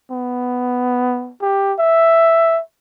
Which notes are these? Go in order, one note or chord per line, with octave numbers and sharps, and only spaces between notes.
B3
G4
E5